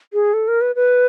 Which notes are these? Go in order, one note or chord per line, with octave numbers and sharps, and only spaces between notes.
G#4
A4
A#4
B4
B4